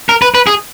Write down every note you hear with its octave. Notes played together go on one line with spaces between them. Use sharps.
A#4
B4
B4
G#4